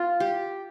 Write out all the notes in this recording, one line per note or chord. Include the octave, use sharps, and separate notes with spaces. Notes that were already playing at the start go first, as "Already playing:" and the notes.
Already playing: B3 F4
G4